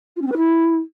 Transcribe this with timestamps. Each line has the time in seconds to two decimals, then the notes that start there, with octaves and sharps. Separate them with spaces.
0.16 F4
0.21 C#4
0.26 C4
0.32 B4
0.37 E4